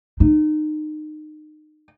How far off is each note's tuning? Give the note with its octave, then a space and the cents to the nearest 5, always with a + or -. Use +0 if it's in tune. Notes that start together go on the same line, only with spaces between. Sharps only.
D#4 -25